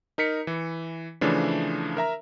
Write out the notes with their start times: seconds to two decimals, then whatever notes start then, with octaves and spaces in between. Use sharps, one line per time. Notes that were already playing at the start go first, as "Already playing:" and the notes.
0.18 D#4 A#4 B6 C#7
0.47 E3
1.21 C#3 E3 F3 A3 D4
1.97 A#4 E5 A#5